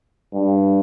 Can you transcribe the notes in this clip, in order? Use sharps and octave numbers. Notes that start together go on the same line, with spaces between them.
G2